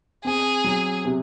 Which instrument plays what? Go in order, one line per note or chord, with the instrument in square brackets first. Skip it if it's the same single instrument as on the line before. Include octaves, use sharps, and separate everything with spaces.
[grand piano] C4 [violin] G#4
[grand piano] F#3
C3